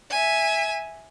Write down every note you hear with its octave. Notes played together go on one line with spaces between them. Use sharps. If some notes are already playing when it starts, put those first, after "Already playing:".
E5 G#5